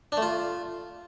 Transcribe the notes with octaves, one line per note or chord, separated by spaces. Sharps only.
D4
A3
F4